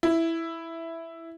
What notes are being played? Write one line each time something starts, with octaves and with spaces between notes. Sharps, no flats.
E4